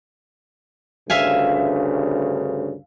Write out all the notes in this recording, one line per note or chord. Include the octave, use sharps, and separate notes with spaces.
D2 G2 C#3 E5 F5 G#5